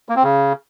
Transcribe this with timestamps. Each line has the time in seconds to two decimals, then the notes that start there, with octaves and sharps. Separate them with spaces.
0.09 A#3
0.16 C4
0.23 C#3